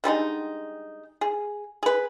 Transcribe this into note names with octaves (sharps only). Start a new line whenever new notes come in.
D3 G3 G#3 D#4
G#4
G#4 B4